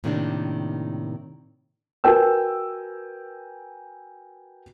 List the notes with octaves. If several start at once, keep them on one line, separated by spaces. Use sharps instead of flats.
A2 C3 D#3 A#3 B3 D4
F#4 A#4 B4 G5 G#5 E6